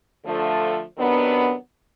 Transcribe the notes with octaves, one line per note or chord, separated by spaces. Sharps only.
D3 F3 A3
C3 D#3 F#3 B3 D4